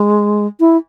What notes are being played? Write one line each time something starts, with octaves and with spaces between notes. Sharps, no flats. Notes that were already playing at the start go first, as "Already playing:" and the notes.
Already playing: G#3
E4